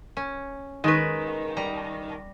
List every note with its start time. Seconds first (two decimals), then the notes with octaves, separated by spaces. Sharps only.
0.17 C#4
0.84 D#3 G#3 B4
1.57 G3 A#5